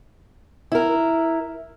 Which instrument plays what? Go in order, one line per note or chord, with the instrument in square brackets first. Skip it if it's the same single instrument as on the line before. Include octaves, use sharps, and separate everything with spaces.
[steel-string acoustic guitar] E4 A#4